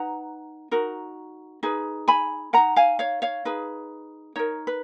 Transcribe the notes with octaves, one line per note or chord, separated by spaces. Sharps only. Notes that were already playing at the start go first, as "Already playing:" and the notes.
Already playing: D#4 B4 F#5 A#5
D#4 F#4 A#4
D#4 G#4 B4
G#5 B5
D#4 A#4 F#5 A#5
F5 G#5
C#5 F5
C#5 F5
D#4 G#4 B4
D#4 A#4 C#5
B4